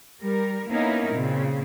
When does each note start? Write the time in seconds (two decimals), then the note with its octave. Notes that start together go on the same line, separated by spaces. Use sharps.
0.20 G3 A#4
0.68 A#3 B3 C#4 D#4 E4 A#4
1.13 A#2 C#3 C4